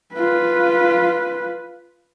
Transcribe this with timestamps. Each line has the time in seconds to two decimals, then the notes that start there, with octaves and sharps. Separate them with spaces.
0.15 F4 B4